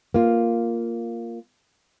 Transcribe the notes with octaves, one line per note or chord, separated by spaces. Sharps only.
A#3 F4